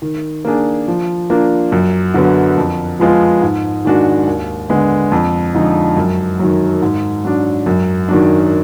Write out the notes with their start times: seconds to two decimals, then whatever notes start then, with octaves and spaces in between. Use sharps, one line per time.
0.02 D#3
0.45 A#3 D4 G#4
0.88 F3
1.30 A#3 D4 F4
1.72 F#2
2.14 D3 F#3 B3
2.57 F2
3.00 F3 G#3 B3 F4
3.42 G#2
3.85 D#3 G#3 D4 F#4
4.27 D#2
4.70 D3 G#3 B3
5.12 F2
5.54 D3 F3 G#3 D#4
5.97 F#2
6.39 D#3 F#3
6.82 G#2
7.24 F#3 D4
7.66 F#2
8.09 D#3 F#3 D4